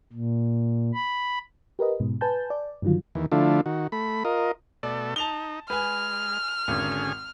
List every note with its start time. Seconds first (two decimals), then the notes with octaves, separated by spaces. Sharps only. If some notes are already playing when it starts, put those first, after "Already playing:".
0.13 A#2
0.94 B5
1.79 G4 A#4 B4 D#5
2.00 G#2 B2
2.21 B4 G#5 A5 G6
2.50 D5
2.82 G2 D3 D#3 F#3 F4
3.15 D#2 E3
3.32 D3 F3 A3 D4 E4 F4
3.66 D#3 F#4
3.92 A3 B5
4.24 F4 A#4 D#5
4.83 B2 A3 A4 D5
5.16 D#4 A5 F7 G7
5.70 G#3 B4 G#5 F6
6.68 G#1 D3 C#4 G#4